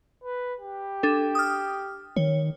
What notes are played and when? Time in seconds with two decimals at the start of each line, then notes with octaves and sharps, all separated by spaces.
0.24 B4
0.61 G4
1.03 D4 A4
1.35 D#6 F6
2.16 D#3 C#5